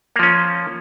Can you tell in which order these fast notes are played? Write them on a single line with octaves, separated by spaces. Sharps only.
A#3 F3 C#4